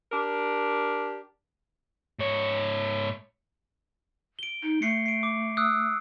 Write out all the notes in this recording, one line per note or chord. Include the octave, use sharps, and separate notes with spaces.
D4 G4 A#4
G#2 C#5
D7 G7
D#4
A3 C7 C#7
C7 D7
D6
D#6 E6 F#6